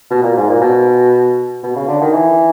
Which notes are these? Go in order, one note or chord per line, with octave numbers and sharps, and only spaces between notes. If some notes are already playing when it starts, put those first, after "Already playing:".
B2
A#2
G#2
A#2
B2
B2
C#3
D3
D#3
E3